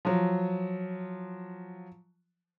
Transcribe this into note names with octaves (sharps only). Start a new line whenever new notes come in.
F3 F#3